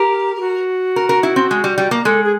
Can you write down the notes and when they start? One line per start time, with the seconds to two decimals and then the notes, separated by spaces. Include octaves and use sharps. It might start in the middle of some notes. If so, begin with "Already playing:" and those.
Already playing: G4 A#4
0.37 G4
0.41 F#4
0.96 A#4
1.09 A#4
1.23 E4
1.36 C4
1.51 G#3
1.64 G3
1.78 G3
1.91 A#3
2.05 G#3 A4
2.24 G#4